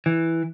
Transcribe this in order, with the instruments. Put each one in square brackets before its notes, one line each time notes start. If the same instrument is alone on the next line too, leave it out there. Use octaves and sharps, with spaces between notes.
[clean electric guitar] E3